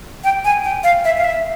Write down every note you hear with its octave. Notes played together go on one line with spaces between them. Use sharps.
G5
G#5
G5
F5
E5
F5
E5